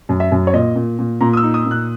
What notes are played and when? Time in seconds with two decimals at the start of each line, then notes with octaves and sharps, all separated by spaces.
0.09 F#2
0.20 E5
0.32 F#2
0.47 C#5
0.54 A#2 D#5
0.76 A#2
0.99 A#2
1.21 A#2 A#5
1.33 D#6
1.37 E6
1.43 D#4
1.54 D#6
1.66 A#2
1.71 F#6